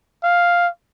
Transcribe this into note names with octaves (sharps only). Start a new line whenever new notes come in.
F5